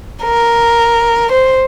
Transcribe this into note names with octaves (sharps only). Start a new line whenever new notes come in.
A#4
C5